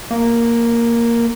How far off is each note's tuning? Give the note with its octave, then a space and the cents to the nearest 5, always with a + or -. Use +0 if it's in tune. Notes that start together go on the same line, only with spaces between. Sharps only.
A#3 +0